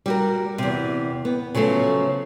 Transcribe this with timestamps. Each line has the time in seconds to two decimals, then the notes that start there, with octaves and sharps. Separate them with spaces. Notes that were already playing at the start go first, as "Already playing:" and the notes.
0.06 G3 F#4 A#4
0.58 E2 C3
1.25 B3
1.55 C#3 F3 F#3 A3